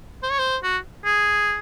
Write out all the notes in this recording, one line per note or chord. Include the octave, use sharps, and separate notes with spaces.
C5
C#5
C5
F#4
G#4